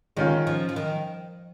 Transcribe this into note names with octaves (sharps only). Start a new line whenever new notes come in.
D#3 G#3 C#4 F4
F3
F3
D#3